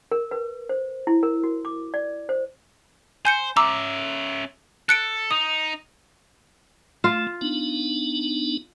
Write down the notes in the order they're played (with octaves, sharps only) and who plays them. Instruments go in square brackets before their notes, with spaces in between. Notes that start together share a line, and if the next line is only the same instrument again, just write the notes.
[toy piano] A#4
B4
C5
E4
A#4
F#4
D6
D5
C5
[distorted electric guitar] C5 [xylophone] G#5 G6 C#7
[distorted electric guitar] C#4 E5 [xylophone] A#5 D6 E6
[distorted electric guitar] A4 [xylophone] F#6 C#7 D7
[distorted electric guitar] D#4 [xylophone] D#6
[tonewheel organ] A3 [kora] F4
[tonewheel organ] B3 D4 D#4